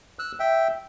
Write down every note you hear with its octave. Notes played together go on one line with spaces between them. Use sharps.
E6 F#6
E5 G5